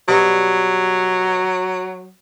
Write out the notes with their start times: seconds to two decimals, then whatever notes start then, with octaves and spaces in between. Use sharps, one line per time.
0.08 B2 F#3 G3